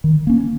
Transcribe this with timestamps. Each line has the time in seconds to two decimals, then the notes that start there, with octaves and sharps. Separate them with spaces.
0.04 D#3
0.27 A#3 C#4